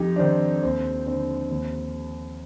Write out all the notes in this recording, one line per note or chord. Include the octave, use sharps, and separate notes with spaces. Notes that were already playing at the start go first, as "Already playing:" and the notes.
Already playing: F2 D#4 G4
D4
D#3 C4
D#2 C4
D3 C4
D#2